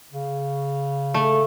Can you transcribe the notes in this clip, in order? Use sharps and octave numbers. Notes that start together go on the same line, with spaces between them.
C#3
A3